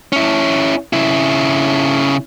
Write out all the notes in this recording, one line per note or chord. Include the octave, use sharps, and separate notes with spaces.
C#4 E4
C#3 E4